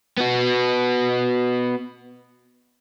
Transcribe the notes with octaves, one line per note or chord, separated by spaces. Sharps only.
B3 F#4